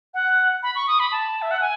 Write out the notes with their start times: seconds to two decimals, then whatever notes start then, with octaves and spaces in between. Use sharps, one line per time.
0.14 F#5
0.63 B5
0.75 C#6
0.88 D#6
0.99 B5
1.12 A5
1.42 E5
1.51 F#5
1.61 G#5